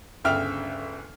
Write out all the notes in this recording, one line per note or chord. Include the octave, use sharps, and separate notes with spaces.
G1 D2 C#3 E5 G5 F6